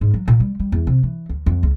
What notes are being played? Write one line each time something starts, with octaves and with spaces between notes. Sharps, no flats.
G#2
F#3
A#2
G3
G3
E2
C3
E3
D2
F2
C#2